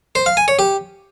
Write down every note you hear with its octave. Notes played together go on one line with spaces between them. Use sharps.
C5
F5
G#5
C#5
G4